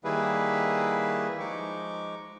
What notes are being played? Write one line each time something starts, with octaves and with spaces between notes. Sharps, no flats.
D#3 G3 A#3 E4 G#4 B4
F3 G#3 D#4 C#6 D6